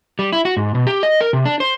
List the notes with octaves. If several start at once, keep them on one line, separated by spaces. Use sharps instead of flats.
G3
E4
F#4
G#2
B2
G4
D#5
A#4
C3
D4
C5